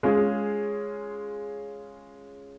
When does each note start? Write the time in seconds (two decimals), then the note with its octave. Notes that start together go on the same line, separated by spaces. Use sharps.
0.03 G#3 C#4 F4 G#4